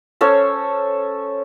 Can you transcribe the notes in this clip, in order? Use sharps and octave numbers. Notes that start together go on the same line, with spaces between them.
C#4 A4 C5 C#5